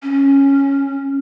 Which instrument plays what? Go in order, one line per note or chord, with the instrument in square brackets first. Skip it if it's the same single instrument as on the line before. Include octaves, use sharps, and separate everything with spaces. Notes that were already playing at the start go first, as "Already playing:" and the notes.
[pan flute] C#4